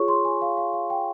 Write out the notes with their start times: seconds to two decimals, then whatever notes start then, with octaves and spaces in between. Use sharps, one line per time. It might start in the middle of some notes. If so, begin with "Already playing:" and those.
Already playing: F4 G#4 C#5 C#6
0.08 C6
0.25 G#5
0.42 F5
0.57 F5
0.73 F5
0.90 G5